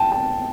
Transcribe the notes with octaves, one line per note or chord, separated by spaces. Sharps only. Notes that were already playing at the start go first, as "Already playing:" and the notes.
Already playing: G5 A5
A5